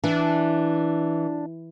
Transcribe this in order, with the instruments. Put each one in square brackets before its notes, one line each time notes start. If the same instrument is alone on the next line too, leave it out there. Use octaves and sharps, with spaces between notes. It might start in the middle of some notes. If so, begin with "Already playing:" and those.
[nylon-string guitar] E3 [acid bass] D4